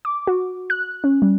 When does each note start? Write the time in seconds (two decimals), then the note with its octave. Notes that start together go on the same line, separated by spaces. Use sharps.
0.05 D6
0.27 F#4
0.70 F#6
1.04 C#4
1.22 G3